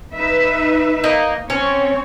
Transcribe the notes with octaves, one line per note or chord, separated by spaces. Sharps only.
D#4 B4 E5
A#3 D#4
C4 C#4 C#5